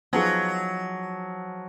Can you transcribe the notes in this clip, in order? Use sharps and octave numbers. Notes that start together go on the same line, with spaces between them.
F3 F#3 B3 D#4 G#4